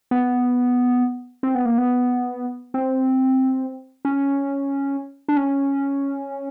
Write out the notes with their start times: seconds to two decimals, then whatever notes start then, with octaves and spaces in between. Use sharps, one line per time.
0.11 B3
1.43 C4
1.55 B3
1.65 A#3
1.78 B3
2.74 C4
4.05 C#4
5.28 D4
5.37 C#4